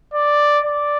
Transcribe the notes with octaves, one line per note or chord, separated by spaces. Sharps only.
D5
D5